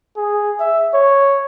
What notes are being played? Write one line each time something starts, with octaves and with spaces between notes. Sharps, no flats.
G#4
E5
C#5